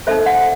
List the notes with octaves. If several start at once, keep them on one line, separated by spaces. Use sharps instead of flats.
D#4 A4 C5 E5
F#5